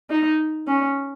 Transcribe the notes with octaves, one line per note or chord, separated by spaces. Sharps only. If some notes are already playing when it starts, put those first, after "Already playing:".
D#4
C#4